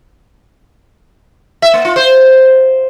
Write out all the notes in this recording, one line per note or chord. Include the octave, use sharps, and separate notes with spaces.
E5
A#3
F4
C5